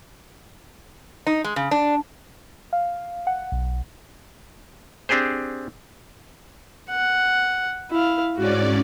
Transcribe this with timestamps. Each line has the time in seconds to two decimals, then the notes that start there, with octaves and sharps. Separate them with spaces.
1.27 D#4
1.44 G#3
1.56 C#3
1.71 D4
2.73 F5
3.27 F#5
3.52 B1
5.09 C4 D4 G4 G#4 C5
6.90 F#5
7.91 E4 F5
8.37 G#2 C#4 F#4 D5